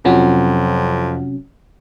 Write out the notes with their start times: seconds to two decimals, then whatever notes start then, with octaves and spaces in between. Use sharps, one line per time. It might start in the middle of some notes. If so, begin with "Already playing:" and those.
0.05 F2 C3 F#3 C#4 F4 F#5